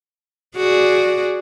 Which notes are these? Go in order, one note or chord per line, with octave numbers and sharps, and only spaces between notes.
F#4 G#4 D5